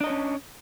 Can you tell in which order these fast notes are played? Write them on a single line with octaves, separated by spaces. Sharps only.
D4 D#5 C#5 C#4